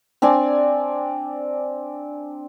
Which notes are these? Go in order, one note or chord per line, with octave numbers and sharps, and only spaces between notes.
C4 D4 D5 G#5